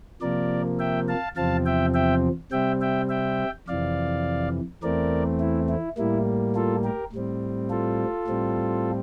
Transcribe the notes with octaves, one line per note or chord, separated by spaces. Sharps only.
C3 F3 A#3 A#4 D5
E5 G5
F5 A5
E2 C3 F3 C4 F5 A5
E5 G5
E5 G5
C3 G3 C4 E5 G5
E5 G5
E5 G5
F2 C3 E3 D5 F5
E2 E3 A3 C4 A#4 D5
E4
E4
A2 G3 A#3 E4
F4 A4
G4 A#4
A2 G3 C4
F4 A4
A2 G3 C4